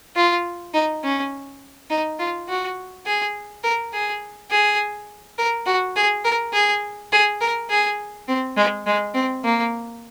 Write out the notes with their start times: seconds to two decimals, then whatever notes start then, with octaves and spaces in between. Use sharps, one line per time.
0.16 F4
0.74 D#4
1.04 C#4
1.90 D#4
2.19 F4
2.48 F#4
3.06 G#4
3.63 A#4
3.93 G#4
4.51 G#4
5.38 A#4
5.66 F#4
5.96 G#4
6.24 A#4
6.53 G#4
7.12 G#4
7.41 A#4
7.70 G#4
8.28 C4
8.57 G#3
8.86 G#3
9.15 C4
9.44 A#3